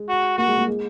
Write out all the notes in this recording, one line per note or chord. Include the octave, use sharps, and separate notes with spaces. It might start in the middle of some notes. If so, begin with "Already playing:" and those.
Already playing: G#3
F#4
A#3 F#4
G#3
A#3
G#3